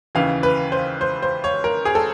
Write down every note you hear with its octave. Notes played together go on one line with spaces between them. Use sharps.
D#2 C#3 E3 F5
B4
C5
C5
C5
C#5
A#4
G#4
A4